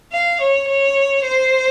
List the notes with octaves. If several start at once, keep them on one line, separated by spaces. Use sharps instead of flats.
F5
C#5
C#5
C5